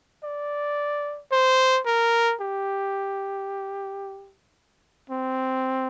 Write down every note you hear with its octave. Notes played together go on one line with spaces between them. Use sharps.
D5
C5
A#4
G4
C4